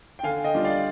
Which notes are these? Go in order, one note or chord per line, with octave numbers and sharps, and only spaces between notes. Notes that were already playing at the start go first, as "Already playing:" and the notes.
G5
D3 F5 G#5
D#5 G5
G3 D4 F4
D5 F5